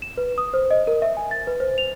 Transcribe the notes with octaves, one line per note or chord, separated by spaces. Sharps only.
E7
B4
D#6
C5
D#5
A#4
E5
G#5
A6
B4
C5
F7